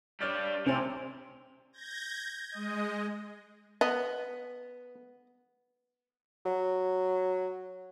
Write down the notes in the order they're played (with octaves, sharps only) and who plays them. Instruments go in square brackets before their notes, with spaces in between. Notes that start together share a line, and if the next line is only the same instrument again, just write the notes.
[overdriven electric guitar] G3 D4 [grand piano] C#5 F6 A6
[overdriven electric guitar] A2 [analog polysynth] C3 [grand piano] C5 C#5 G#5
[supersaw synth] G6 G#6 A#6
G#3 D#5
[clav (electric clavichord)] B3 [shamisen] D#5
[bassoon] F#3